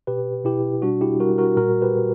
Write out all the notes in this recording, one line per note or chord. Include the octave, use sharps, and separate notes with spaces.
B2 G4 B4
B2 E4 G4
G3 D4 F#4
E4 G4
G3 F#4 A#4
F#4 A#4
A#2 F#4 A#4
G4 B4
A#2